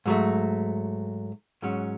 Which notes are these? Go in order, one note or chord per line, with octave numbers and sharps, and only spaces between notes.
G#2 F#3 A3
G#2 F#3 C#4